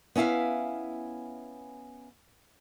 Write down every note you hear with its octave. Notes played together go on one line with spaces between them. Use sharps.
B3 C#4 E4 F5 G#5